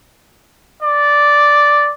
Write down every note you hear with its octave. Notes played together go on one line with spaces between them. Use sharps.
D5